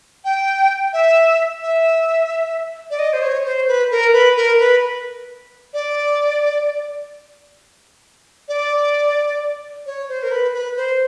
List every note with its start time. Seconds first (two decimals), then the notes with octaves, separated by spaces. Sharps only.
0.25 G5
0.93 E5
1.62 E5
2.90 D5
2.99 D#5
3.13 C5
3.22 C#5
3.45 C5
3.68 B4
3.91 A#4
4.13 B4
4.37 A#4
4.59 B4
5.74 D5
8.48 D5
9.86 C#5
10.09 C5
10.23 A#4
10.31 B4
10.54 B4
10.77 C5